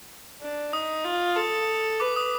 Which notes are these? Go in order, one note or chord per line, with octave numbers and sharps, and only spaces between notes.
D4
D#4 D#6
F4
A4
B4 D6
D#6